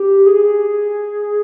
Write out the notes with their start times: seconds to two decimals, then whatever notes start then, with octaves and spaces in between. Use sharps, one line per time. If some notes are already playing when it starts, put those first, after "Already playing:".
Already playing: G4
0.26 G#4